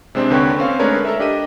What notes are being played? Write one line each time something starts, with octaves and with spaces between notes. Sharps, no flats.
C3 G#3 C4 D4
D#2 D3 B4 C#5 G5 C#6
C4 C#4 F5
G#3 A3 D4 A#4 B4 C#5
A4 A#4 E5
D4 G4 D#5 D#7